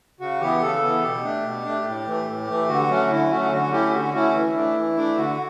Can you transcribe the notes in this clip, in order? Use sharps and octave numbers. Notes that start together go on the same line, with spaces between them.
C#3 F#4
E3 B3 G4
C#3 A4
E3 B3
B2 G4
A3 D4
B2
A3 D4
A2
E3 A3
A2
E3 A3
D3 F#4
F#3 A3 C#4
D3 E4
F#3 A3 C#4 F#4
D3 F#4
A3 C#4 E4 G4
D3 F#4
A3 C#4 E4 F#4
E3 E4
A3 D4
E3
A3 D4
D3 F#4